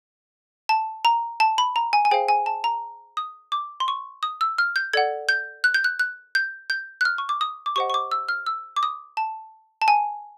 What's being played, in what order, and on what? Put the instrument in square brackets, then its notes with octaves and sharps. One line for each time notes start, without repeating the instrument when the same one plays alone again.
[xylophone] A5
A#5
A5
B5
A#5
G#5
G#5
G#4 C5 F5 G5
G#5
A5
A#5
D#6
D6
C6
C#6
D#6
E6
F6
G6
A4 D5 F#5 G#6
G6
F#6
G6
F#6
F#6
G6
G6
F#6
F6
C#6
D6
D#6
D6
G4 C5 D#5 F#5 C#6
C#6
D6
E6
F6
E6
D6
D#6
A5
A5
G#5